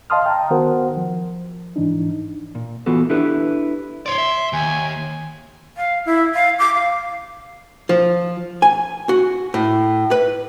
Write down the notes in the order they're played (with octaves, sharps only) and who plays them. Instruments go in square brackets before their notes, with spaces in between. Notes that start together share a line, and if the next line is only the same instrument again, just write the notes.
[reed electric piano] D#5 F5 A5 C6 D#6 F6
G5 A5 A#5
D#3 B3 F#4 A#4 C5 F#5
F3
G#2 E3 D4 D#4
[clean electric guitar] A#2
E3 B3 F4 F#4 A4
D4 E4 G4 A4 B4
[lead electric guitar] C#5 D5 [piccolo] C6
[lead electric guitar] E5
[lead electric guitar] D#2 [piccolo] G#5
[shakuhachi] F5
E4
F5
D6
F5
[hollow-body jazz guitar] F3
G#5
F#4
A2
B4